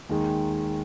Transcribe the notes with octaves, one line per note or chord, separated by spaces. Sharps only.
D#2 D#3 G#3